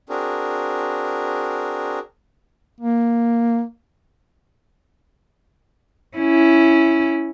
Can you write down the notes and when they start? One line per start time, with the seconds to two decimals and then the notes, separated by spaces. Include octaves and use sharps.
0.09 C4 D4 F#4 G#4 A#4
2.81 A#3
6.17 C#4 E4